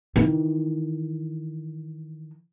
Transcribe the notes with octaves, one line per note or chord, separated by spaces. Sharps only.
D#3 E3